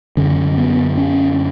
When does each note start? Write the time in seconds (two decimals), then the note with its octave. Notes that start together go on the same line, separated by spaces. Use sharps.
0.17 F#2 D3 C#4
0.57 B3
0.97 C#4